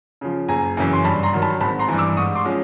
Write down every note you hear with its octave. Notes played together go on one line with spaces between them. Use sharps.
C#3 F3
F#1 G#5 A#5
F#2 C#3 E3
C6
G2 A5 B5
A#5 C6
D#3 F#3
A5 B5
G#1 A5 B5
A#5 C6
G2 E3
D6 E6
G#2 C#6 D#6
C6 D6
F3 G#3 C#4